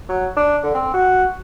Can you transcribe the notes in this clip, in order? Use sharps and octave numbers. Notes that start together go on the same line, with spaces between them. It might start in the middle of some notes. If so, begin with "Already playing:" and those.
F#3
D4
D3
C4
F#4